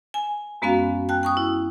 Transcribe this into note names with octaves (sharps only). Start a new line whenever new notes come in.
G#5
F#2 G#3 B3 C#4 F#4 F5
G5 A5 F#6
G5 C#6 D#6
E4